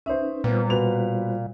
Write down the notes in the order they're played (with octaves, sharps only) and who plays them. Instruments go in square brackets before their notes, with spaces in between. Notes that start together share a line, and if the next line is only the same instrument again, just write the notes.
[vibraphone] C#4 D#4 B4 [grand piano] C5 E5
[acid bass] A#2 [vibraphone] G3 F4 C5 [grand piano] B3
[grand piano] B2 B4 F7